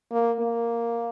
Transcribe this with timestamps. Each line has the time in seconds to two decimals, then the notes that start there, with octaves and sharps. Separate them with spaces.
0.11 A#3
0.39 A#3